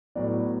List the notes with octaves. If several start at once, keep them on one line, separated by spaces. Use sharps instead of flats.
A2 F#3 B3 D5